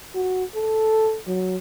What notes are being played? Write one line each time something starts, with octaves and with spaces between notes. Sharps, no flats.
F#4
A4
F#3